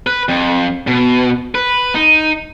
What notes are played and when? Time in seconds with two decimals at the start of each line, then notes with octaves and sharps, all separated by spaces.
0.07 B4
0.29 F2
0.87 B2
1.55 B4
1.95 D#4